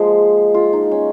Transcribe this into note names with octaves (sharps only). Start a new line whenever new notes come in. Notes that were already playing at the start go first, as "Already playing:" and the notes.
Already playing: F3 G#3 A#3
F4
D#4
C#4